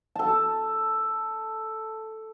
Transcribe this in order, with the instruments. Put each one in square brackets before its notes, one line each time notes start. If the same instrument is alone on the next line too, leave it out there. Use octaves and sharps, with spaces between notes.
[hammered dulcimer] A4 A5